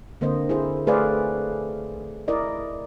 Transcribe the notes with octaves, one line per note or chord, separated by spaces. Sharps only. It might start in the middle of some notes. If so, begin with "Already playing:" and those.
D3 A#3 C4 C5 D#5
E4 G#4 C5
A3 G#4 B4 C5 D5 F5
E4 A#4 D5 D#5